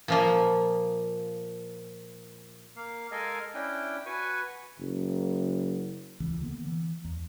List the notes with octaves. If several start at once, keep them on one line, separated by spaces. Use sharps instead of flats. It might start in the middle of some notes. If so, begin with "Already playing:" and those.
A#2 F3 A#3
A#3 F5
G#3 A4 A#4 D#5 F5 G#5
C#4 D4 E4 G5
F#4 B4 G#5 C#6
F#1
D#1 C#2 E3
D3 A#3 B3
E3
E2